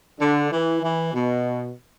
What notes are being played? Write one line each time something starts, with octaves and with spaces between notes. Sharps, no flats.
D3
E3
E3
B2